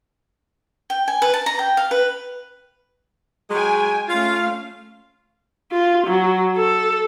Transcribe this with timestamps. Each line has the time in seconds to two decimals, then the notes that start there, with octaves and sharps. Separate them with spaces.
0.90 G5
1.08 G#5
1.22 B4
1.34 A5
1.46 A#5
1.59 G5
1.77 F5
1.91 B4
3.50 F#3 G#3 G5 G#5
4.08 A3 C#4 F4 F5
5.72 F4
6.07 F#3
6.57 A4